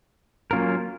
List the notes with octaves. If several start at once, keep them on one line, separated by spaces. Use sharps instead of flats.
F#3 A#3 C#4 F4 A#4